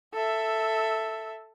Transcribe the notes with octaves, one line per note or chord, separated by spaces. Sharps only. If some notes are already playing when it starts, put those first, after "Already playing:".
A4 E5